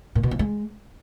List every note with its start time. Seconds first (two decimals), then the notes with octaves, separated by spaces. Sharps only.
0.15 A#2
0.23 B2
0.31 F3
0.39 G#3